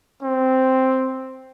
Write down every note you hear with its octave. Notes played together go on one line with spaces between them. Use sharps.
C4